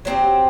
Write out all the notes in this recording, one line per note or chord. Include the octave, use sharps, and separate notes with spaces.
F#3 C4 D#4 G4